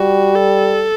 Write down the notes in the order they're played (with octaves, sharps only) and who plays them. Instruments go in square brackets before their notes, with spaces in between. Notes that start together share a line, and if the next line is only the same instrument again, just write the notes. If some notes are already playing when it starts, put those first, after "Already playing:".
Already playing: [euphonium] G3 [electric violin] F#4
[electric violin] A4